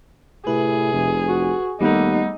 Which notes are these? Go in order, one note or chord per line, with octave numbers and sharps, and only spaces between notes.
A2 C3 G#4 B4
F1
F#4
D#2 G3 A3 B3 D#4